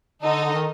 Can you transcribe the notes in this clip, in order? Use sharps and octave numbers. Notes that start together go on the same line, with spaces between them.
D3 D#4 A4 D#5
D3
D#3